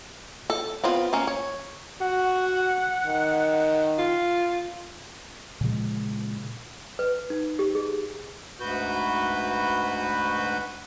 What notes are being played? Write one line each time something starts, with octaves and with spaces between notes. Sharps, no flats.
A4
B3 C4 F4
A#3 C#4
C#5
F#4 F#5
D#3
F4
A#2 C#3 F3 G#3
B4
D#4
G4
G#4
D2 G#2 F#4 B4 G6